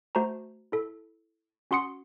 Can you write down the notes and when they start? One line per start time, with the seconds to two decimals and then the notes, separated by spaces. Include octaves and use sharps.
0.15 A3 F#4 C5 A5 A#5
0.72 E4 A4
1.71 C#4 F#4 F#5 C6 D#6 C#7